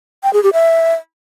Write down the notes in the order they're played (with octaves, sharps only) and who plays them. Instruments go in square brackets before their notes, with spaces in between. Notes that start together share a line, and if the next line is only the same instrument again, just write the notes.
[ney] G5
G#4
G4
E5